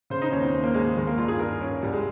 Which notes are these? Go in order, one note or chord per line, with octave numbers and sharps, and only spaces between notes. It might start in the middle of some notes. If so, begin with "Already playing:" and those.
C#3 C5
D#4
D#2 C#4
C4
D#2
A#3
D#2 G#3
D#3 G#3
A#3
G2 F4
G#4
G2 A#4
G2 C#4
C2 G3
G#3